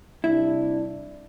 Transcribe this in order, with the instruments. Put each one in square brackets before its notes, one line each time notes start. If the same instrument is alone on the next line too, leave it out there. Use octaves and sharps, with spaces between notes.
[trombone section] C3 G3 D4 [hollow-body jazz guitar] E4